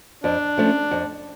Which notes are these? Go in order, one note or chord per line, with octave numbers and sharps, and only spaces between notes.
F2 D4
F3 A3 C#4
F2